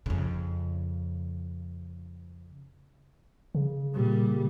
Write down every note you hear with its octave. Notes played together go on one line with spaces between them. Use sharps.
F2 C#3
C#3
A#2 G3